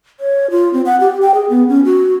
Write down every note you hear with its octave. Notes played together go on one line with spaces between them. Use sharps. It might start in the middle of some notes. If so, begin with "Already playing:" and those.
C#5
F4
C4
F#5
G4
G5
G#4
B3
C#4
F#4